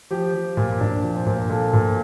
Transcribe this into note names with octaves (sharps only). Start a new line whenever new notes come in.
F3 G4
F3
A#2
A#2 D4
F3
C5
A#2
A#2 A4
A#2